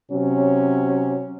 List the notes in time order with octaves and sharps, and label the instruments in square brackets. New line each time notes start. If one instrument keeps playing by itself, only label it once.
[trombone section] C3 F#3 C#4